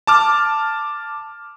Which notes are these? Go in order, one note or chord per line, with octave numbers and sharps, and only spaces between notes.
A5 D6 F6